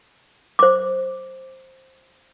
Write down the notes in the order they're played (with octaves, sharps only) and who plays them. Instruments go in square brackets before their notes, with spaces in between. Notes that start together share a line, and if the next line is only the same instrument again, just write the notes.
[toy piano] C5 D6